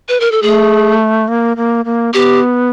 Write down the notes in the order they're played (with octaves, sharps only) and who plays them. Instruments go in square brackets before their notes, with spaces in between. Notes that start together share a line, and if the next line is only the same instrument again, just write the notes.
[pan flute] B4
A#4
A4
[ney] A3 [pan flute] G#4
[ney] A#3
A#3
A#3
[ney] B3 [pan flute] G4